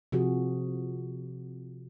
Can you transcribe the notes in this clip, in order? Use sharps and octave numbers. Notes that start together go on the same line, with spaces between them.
C3 F3 F#4 G#4